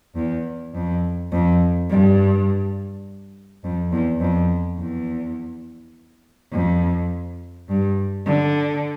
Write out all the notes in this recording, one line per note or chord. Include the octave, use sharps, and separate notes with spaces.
E2
F2
F2
G2
F2
E2
F2
E2
F2
G2
D3